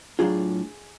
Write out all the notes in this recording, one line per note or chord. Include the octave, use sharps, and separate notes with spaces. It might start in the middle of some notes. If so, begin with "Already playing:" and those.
A2 F#3 A3 D4 F4 G#4